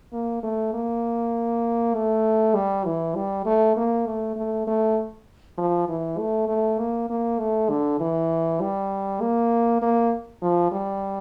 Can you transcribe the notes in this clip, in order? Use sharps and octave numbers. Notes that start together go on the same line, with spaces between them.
A#3
A3
A#3
A3
G3
E3
G3
A3
A#3
A3
A3
A3
F3
E3
A3
A3
A#3
A#3
A3
D3
E3
G3
A#3
A#3
F3
G3